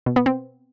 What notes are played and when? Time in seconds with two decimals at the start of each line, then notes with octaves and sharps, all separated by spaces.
0.06 B2
0.16 B3
0.26 C4